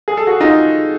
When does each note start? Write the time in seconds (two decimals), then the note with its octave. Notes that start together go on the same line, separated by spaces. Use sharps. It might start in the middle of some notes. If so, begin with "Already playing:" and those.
0.08 G#4
0.17 A4
0.27 F#4 G#4
0.40 D#4 F4